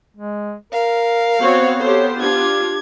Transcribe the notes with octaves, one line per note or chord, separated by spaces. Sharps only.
G#3
A#4 F5
B3 C4 F#4 C5 C#5
G4 A4 C5 C#5
D4 F4 G4 G#6